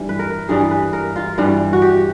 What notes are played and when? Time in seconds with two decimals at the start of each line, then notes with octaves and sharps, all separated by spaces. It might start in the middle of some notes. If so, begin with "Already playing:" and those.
Already playing: G2 E3 G3
0.09 B4
0.19 A#4
0.49 G2 E3 G3 G#4
0.71 B4
0.93 A#4
1.16 F4
1.38 G2 E3 G3
1.73 F#4
1.82 G4